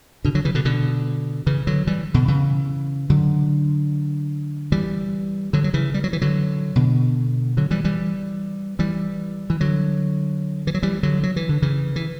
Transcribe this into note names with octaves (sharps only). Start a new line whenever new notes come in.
B2 D3
D3 F#3
C#3 E3
B2 D3
B2 D3
C#3 E3
D3 F#3
E3 G3
B2 D3
C#3 E3
D3 F#3
E3 G3
D3 F#3
F#3
C#3 E3
G3
F#3
E3
D3 F#3
B2 D3
D3 F#3
E3 G3
E3 G3
E3 G3
E3
D3 F#3
E3
F#3
E3 G3
D3 F#3
F#3
E3
D3
C#3 E3
E3